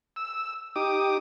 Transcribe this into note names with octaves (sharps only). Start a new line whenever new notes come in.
E6
D#4 G4 D6 D#6